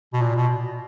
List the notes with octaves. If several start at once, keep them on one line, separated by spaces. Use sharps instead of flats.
B2
A#2
B2